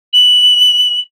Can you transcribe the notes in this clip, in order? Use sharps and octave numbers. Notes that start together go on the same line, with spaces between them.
F#7